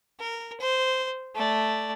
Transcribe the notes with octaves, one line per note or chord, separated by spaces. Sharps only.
A#4
C5
A3 D5